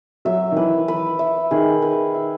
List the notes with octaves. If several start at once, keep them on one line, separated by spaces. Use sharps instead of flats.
F#3 E5
D#3
E3 B4
B4
E5
D#3 G#4
B4
E5